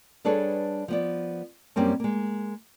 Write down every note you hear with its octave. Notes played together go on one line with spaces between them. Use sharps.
G3 D4 G#4 A4 B4 C#5
F3 B3 D5
F#2 G3 A#3 C4 C#4
G#3 A#3